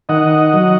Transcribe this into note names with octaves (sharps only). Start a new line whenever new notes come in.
D#3 D#5 F#5
F#3